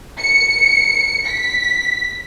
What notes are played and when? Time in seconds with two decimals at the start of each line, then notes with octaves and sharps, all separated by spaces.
0.21 C#7
1.28 B6